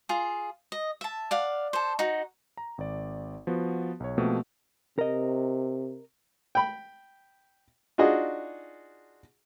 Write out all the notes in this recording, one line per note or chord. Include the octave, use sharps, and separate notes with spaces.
F4 G#4
D#5
E5 A5
D5 F5 F#5
A4 C5
D#4 F#4
A#5
G#1 D5
F3 B3 F#4
B1 C#5
B2 F3 A3 A#3 C4 G4
C3 A#4 D#5
G5 B5
D4 D#4 F4 F#4 G#4 D#5